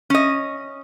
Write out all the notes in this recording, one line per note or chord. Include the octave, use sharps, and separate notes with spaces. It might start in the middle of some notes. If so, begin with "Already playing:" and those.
C#4 D#5